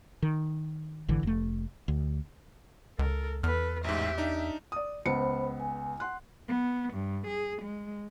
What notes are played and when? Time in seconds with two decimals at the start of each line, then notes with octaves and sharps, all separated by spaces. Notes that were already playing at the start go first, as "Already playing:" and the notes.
0.22 D#3
1.08 G#1 D3 E3
1.23 F1 A3
1.88 D2
2.99 C#2 A4 A#4
3.43 E2 A4 B4 F6
3.84 A1 G#2 G4 E5
4.18 D4 D#4
4.72 D5 D#6
5.05 C#2 B3 C5 B5 C#7
5.60 G#5
6.00 F#5 C6 F#6
6.48 B3
6.94 G2
7.27 G#4
7.62 G#3